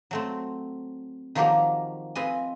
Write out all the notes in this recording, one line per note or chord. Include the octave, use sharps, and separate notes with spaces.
F#3 A3 C4
D#3 F3 F#3 A#3 G4 A#4
C4 F4 B4 D#5 G#5